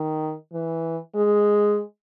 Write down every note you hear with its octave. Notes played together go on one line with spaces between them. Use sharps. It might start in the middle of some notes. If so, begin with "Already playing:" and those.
Already playing: D#3
E3
G#3